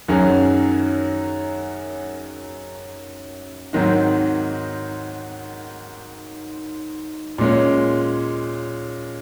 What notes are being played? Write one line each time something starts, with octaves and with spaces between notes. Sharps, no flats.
F#2 D#3 F#3 C#4 G#4
G#2 D#3 F#3 C4 D#4
A#2 G#3 C#4